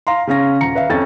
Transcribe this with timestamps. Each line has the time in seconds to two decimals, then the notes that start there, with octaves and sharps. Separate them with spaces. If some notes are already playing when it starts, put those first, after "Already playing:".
0.07 F5 A#5 C6
0.27 C#3 C#4 F5 A#6
0.61 D#1 A#5 C#7
0.75 B4 E5 F5
0.90 F2 C#4 A6